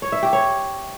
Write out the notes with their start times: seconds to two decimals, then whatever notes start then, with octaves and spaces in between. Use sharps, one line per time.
0.02 C#5
0.12 E5
0.23 G4
0.33 C#5